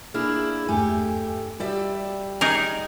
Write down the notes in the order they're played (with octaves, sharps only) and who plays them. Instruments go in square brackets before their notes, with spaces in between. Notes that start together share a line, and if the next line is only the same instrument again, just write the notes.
[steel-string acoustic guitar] A#3 D4 E4 [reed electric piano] G#4 F6
[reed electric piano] E2 G2 G#5 [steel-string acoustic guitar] A3 G4
[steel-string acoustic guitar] G3 D5 E5 [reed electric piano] F#4 G4
[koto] D#4 G#4 A#4